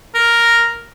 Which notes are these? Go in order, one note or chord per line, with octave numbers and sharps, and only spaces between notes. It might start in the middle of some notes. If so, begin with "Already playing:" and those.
A#4